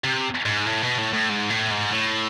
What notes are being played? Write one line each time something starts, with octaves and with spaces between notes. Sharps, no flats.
C3
G#2
A2
B2
A2
A2
G#2
A2
G#2
A2